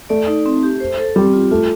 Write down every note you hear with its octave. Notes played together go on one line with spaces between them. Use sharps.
A3 D5
D#4
C4
G4
C5
A4
G3 C4
F4
A3 F4